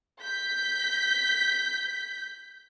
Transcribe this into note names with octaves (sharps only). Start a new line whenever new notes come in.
G6 B6